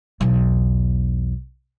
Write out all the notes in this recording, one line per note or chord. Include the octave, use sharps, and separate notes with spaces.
B1 E2